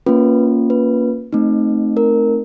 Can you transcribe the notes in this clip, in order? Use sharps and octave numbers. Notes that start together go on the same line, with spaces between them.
A#3 C#4 F4 B4
B4
A3 C4 D#4
A#4